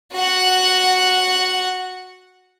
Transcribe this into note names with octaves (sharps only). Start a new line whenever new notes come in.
F#4 F#5